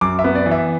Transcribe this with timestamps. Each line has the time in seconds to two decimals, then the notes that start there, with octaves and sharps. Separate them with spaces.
0.01 F#2 D6
0.19 E5
0.24 B3
0.35 D5
0.46 E3
0.51 E5